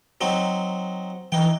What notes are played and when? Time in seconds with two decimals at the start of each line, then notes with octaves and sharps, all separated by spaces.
0.21 F#3 C4 D#4
1.32 E3 D#4 G5